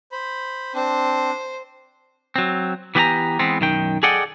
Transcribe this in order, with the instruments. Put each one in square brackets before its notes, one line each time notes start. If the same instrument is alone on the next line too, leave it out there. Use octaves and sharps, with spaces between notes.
[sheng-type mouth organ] C5 B5
[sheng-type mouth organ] C4 D4 [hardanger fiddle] C5
[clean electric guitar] F#3 C4
E3 B3 G4 D5 G#5 A#5
E3 G#3 B3 C4
B1 F#2 D#3 G5
G#4 A4 D5 D#5 F#5 G5